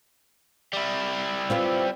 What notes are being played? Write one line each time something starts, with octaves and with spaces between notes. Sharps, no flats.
G3 E4
C4 F4 B4